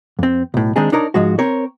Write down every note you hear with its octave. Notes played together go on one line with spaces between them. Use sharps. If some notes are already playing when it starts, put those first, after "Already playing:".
F2 C4
B1 A2
D#3 G#3 C4 D4 D#4 G#4
D4 D#4 A#4 C#5 D5
G#2 F3 G#3 F#4
C4 A#4 C#5